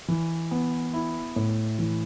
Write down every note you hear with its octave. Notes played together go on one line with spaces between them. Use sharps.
E3
B3
E4
A2
E3